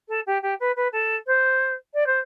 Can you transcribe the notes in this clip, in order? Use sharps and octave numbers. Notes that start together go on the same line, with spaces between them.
A4
G4
G4
B4
B4
A4
C5
D5
C5